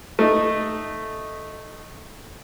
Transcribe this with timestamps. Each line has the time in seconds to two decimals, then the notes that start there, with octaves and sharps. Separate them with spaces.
0.19 A3 D#4